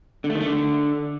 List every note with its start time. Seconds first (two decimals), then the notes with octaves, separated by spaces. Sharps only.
0.24 D3
0.30 A3
0.35 D#3
0.40 A3
0.46 D3